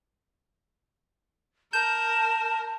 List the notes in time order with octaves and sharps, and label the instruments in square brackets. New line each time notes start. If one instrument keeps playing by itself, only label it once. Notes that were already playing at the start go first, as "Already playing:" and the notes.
[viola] A#4 [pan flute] A5 [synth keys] G6 [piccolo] E7